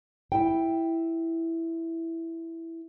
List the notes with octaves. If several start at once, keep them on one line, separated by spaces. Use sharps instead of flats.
E4 G5